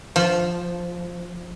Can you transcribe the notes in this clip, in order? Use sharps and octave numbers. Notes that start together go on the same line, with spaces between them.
F3